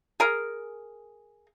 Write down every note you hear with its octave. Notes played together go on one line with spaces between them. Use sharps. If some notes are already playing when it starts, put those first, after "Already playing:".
G#4 A#4